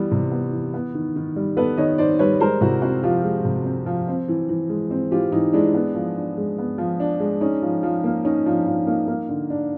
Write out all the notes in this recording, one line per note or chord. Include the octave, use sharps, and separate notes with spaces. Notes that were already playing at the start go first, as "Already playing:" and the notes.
Already playing: E3 G3 B3
C3
B3
E3
B3
D#3
D#3
G3
B3 A4 B4
D#3 C#5 D#5
D#3 C5 D5
G3 B4 C#5
G#3 A#4 C5
C3 E4 F#4
C4 E4 F#4
F3 F4 G4
G#3
C3
C4
F3
C4
E3
E3
G#3
C4
E3 F4 G4
E3 D#4
G#3 D4 E4
B3
F3
D4
G#3
B3
F3
D4
G#3
C#4 D#4
F3
F3
A#3
C#4 D#4
F3 D4
F3 D#4
A#3 D#4
A#3 D#4
D3
D4